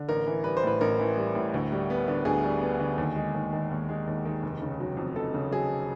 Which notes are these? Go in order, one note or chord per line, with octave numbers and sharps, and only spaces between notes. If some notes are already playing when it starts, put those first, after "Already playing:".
Already playing: D3
A1 A#4
E3
G3 B4
C5
A2 B4
A1 A#4
E3
G3
A2
D2
G3
B3
D3
D2 G#4
G3
B3
D3
D#2
G#3
D#2
D#3
D#2
G#3
D#2
D#3
F1
C#3
F#3
F2
F1 A4
C#3
F#3 G#4